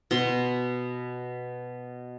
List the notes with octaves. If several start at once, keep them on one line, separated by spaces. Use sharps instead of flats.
B2 C6